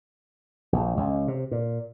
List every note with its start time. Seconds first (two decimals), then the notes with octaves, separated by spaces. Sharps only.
0.73 A#1
0.97 C#2
1.28 C3
1.51 A#2